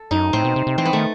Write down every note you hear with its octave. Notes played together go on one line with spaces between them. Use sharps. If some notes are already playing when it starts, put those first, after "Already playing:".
Already playing: A4
F#2 D#4
A2 C4
B2
C3
C3
E3 C4
B3
D#3 A3